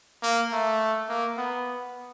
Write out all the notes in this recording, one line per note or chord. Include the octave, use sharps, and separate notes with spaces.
A#3
A3
A#3
B3